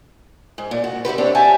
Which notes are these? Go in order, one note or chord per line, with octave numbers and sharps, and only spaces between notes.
G#2
A#2
F#4
E4 F#4 G4 B4
C4 D4 G4 C#5
G4 D5 E5 G#5 A5